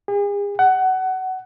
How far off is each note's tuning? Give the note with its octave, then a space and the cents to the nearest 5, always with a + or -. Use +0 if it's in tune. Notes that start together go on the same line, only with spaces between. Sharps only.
G#4 -40
F#5 +20